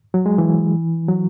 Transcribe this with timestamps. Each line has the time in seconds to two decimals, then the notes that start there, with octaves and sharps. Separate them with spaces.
0.14 F#3
0.26 G#3
0.38 E3
1.08 F#3